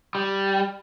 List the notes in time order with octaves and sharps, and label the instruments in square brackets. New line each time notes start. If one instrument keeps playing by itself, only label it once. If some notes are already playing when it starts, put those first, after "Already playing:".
[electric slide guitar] G3